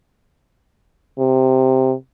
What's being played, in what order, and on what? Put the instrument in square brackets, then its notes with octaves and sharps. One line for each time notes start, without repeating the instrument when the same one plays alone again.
[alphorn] C3